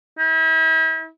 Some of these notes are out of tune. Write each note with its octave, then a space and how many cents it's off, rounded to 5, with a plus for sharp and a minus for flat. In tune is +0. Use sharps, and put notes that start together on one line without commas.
E4 -40